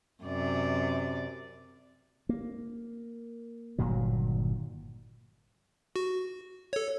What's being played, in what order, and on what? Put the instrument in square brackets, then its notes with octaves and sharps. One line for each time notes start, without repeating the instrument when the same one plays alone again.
[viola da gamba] F#2 C3 D5
[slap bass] A#3
G1 A#2 D#3 F#3
[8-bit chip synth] F#4
A4 C#5